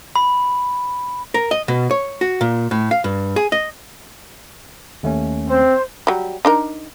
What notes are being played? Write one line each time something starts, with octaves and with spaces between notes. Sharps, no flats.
B5
A#4
D#5
B2
C#5
F#4
A#2
A2
F5
G2
G#4
D#5
D#2 A3 C#4
C4 C5
F#3 G3
D4 D#4 A#4